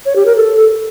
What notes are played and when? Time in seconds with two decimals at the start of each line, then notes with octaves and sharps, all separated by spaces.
0.06 C#5
0.16 G4
0.26 A#4
0.36 A4